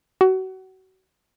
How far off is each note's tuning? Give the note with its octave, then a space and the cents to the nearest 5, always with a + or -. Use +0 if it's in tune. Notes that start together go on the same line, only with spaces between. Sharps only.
F#4 +30